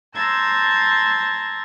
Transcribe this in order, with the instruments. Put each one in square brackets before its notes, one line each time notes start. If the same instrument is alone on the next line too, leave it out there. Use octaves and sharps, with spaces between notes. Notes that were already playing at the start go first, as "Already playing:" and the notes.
[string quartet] A5 A#5 C6 E6 G6 G#6